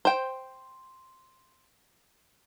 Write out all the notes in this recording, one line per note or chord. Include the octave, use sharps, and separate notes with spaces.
C5 G5